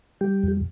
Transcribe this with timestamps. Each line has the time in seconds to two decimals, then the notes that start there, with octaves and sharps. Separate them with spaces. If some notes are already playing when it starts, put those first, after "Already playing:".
0.21 G3 G4
0.43 F2